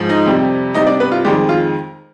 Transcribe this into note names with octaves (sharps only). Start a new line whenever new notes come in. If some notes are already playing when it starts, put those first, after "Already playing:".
Already playing: G#2 F3 G#3
D#4 D#5
F2 C3 G3
C3 G3 D#4 D#5
D4 D5
B3 B4
F4
F2 D#3 G3 G#3 G4
F4